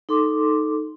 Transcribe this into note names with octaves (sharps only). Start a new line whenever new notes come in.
D#4 A4 C6 D6